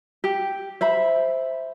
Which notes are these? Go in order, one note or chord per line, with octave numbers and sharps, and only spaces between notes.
G4
C5 E5 B5